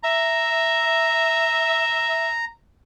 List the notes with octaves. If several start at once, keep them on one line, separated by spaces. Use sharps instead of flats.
E5 A#5